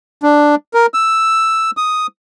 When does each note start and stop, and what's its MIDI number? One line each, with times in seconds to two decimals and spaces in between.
0.23 0.55 62
0.74 0.86 70
0.94 1.71 88
1.77 2.07 87